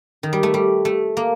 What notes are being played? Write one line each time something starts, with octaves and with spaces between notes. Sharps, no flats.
D#3
G3
A3
G3
A3
A#3